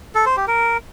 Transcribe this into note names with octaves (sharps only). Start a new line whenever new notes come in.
A4
C5
G4
A#4